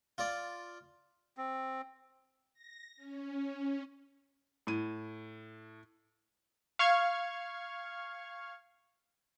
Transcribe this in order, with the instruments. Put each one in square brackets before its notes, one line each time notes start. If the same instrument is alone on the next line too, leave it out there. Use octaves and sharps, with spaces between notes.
[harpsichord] F4 D5
[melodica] C4
[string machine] A#6
C#4
[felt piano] A2 D#7
[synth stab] F5 C#6 F6 G#6